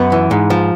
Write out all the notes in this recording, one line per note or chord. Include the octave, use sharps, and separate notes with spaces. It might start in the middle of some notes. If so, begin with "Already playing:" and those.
Already playing: F#2 B3
E3
G#2
F3